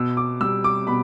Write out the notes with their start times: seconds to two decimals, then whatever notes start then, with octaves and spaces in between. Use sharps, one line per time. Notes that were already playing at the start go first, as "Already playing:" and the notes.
Already playing: B2 E6
0.17 D6
0.41 G3 E6
0.64 D6
0.87 B2 B5